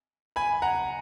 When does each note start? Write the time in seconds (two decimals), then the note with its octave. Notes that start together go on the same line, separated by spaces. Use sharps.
0.36 G#5 B5
0.62 F#5 A#5